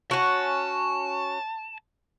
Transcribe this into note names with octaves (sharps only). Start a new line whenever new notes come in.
C#4 F#4 A5